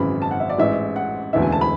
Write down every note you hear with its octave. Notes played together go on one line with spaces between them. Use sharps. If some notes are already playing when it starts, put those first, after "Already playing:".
Already playing: G#1 F#2 C#3 E3 B5
A5
F#5
E5
D5
A1 G#2 E3 E5
F#5
E1 D2 C#3 E3 E5
G#5
A5
B5